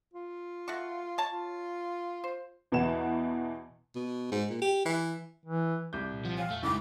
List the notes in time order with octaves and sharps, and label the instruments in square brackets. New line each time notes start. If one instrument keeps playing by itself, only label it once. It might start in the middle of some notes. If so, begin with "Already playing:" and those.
[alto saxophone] F4
[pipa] A3 F#4 C#6
C#5 A5
[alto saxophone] F4
[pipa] C5
[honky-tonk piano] E2 B2 E3 F#5 E7
[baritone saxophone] B2
G#2
A#2
G4
E3
[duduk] E3
[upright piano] C2 D6 G6
[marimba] A#2
[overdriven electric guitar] F3 [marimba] F#5
[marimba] C#5 G5 G#5 [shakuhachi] F5
[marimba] F2 [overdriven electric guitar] A3
[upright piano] F#1 D2 C#3 [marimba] G#3 D#4 E4 [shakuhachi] D6